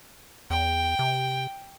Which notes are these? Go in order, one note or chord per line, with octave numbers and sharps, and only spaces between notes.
E2 G5
C3